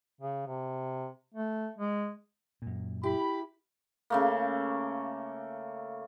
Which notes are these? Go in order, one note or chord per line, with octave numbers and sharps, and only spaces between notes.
C#3
C3
A3
G#3
F#2 A#2
E4 G4 B5
C#3 A3 A#3